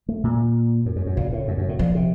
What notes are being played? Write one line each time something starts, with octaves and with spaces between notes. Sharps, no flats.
A3
A#2
F#2
F#2
F#2
A#2 C#3
A2
F#2
F#2
A2
A#2 F3
C3